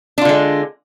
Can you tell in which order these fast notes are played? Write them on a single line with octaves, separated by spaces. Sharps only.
D4 F4 D3 G#3